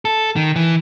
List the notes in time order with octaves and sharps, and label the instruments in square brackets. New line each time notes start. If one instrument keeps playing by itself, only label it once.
[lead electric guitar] A4
D#3
E3